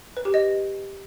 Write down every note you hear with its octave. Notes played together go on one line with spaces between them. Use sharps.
B4
G4
D#5